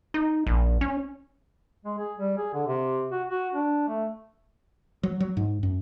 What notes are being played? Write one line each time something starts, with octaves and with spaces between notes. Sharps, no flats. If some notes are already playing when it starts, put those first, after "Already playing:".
D#4
A#1
C#4
G#3
G#4
G3
G#4
D3
C3
F#4
F#4
D4
A3
F#3
F#3
G#2
F#2